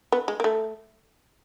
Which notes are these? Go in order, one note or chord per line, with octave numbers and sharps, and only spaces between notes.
B3
G#3
A#3
A3